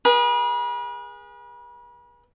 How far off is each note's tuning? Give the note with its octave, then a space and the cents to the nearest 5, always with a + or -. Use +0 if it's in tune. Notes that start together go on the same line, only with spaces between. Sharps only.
G#4 -15 B4 -40